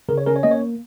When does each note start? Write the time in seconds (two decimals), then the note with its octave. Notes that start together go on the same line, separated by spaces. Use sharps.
0.09 C#3 A#4
0.18 C#5
0.26 C#4 A#4
0.36 C#5
0.43 A#3 D#5
0.51 C#5